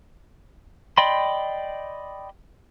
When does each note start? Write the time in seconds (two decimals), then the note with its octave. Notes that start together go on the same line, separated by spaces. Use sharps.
0.98 D5 D#5 G5 B5 C6